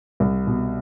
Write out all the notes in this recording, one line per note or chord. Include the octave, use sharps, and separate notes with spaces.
C2
B2